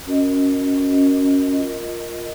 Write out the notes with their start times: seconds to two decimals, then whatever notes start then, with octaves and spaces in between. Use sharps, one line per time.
0.06 C#4 F#4 A#4 D#5
0.77 C#4 F#4 A#4 D#5
1.49 F4 A#4 D#5